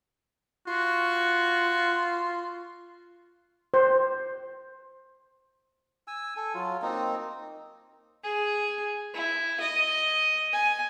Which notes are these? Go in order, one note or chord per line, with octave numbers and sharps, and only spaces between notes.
F4 F#4
C5
G#5 E6
A4 G#5
F#3 F4
A#3 C4 D#4
G#4
E4
D#5
G#5